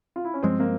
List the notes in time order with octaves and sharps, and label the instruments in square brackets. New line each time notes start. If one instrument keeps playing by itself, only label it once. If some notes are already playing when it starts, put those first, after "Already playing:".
[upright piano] F4
E4
C#4
[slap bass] G2 F3 G#3 [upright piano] C4
[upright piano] A#3